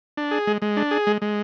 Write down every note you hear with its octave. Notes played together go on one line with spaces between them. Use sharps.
D4
G#4
G#3
G#3
D4
G#4
G#3
G#3